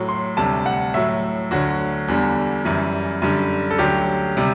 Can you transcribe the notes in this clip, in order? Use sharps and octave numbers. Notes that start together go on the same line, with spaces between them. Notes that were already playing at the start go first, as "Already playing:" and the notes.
Already playing: A2 F#3
C6
D2 C3 G3 A5
F#5
A2 F#3 E5
D2 D3 F#3 F#4
E2 D3 G3
F#2 E3 G3
F#2 D3 G3
A4
D2 D3 F#3 G4
C3 G3